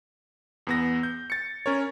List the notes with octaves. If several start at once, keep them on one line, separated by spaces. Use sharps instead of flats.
E2 B3 A#6
G6
A6 C#7
C#4 A#4 C#5